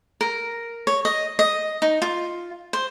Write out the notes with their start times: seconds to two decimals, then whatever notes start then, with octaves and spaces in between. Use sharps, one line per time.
0.21 A#4
0.87 C#5
1.05 D#5
1.39 D#5
1.82 D#4
2.02 F4
2.73 C5